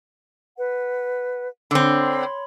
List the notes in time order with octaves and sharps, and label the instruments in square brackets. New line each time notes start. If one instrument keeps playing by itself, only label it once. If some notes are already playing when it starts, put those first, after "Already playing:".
[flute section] B4 F#5
[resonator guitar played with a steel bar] D3 C4 [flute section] C#5 B5 C6